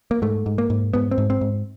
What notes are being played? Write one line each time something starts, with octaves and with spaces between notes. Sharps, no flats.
A#3
G#2 A3
G#2
A#3
G#2
G#2 B3
C4
G#2
C4
G#2